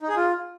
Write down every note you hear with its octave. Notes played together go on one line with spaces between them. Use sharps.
D#4
G#4
F4